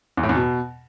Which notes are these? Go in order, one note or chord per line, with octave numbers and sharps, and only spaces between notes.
E2
A2
E2
B2